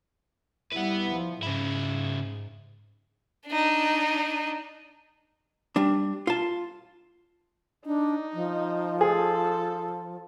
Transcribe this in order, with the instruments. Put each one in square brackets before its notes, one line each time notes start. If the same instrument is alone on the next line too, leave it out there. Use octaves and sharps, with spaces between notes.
[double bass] G3 E4 [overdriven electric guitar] B4 F#5
[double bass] F3
[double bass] G#2 [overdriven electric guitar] C#3 E4
[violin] D4 D#4
[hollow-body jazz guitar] G3 D4
F4 A5
[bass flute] D4 [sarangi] D#4
[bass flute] F3
[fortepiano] G#4 [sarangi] A4